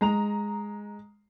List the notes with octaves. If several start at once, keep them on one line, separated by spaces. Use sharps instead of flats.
G#3 A#5 F7